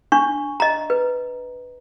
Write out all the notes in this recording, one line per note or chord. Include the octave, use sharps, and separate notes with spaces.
D4 C#6
D#5 A#5
B4